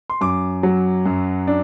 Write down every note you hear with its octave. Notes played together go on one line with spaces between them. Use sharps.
C6
F#2 D6
F#3
F#2
D4